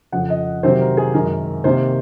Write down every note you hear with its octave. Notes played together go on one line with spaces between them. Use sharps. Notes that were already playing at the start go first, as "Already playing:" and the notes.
F2 C#3 F3 F#5
D#5
C3 D#3 F#3 C4 C5
A#4
G#4
F#2 D#3 G#3 A#4
C3 D#3 A#3 C5